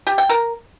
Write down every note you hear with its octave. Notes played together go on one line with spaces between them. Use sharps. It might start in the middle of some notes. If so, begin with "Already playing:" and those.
G4
G5
A#4